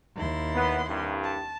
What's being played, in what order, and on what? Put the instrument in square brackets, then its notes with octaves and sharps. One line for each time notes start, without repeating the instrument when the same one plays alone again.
[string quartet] D#2 E4 C6
[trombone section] B3
C2 G2
[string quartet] A5